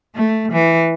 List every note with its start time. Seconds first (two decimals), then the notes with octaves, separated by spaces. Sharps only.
0.15 A3
0.52 E3